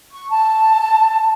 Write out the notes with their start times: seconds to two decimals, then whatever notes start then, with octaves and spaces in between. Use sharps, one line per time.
0.12 C#6
0.31 A5